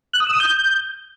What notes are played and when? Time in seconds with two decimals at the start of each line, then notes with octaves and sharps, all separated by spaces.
0.14 F#6
0.20 D#6
0.27 E6
0.33 D#6
0.40 G6